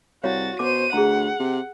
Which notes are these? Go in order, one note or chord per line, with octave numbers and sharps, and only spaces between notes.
C2 F#4 C#5 F5 A6
B2 C5 D6 D#7
D2 G#4 F#5 A#5
C3